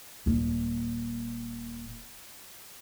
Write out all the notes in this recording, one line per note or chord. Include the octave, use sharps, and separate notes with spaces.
D#1 A#2